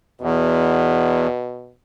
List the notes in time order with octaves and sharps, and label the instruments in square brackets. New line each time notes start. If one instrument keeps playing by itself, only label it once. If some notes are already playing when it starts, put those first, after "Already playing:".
[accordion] E2 [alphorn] B2